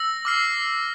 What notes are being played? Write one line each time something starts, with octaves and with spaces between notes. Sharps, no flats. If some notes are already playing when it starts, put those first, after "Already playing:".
Already playing: E6 A#6
D6 F6 C7